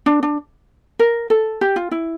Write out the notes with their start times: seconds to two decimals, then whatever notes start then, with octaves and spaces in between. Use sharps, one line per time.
0.06 D4
0.23 D4
0.99 A#4
1.30 A4
1.61 G4
1.76 F4
1.91 E4